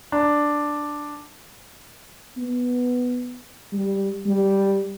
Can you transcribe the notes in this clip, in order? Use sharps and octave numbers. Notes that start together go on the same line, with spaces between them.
D4
B3
G3
G3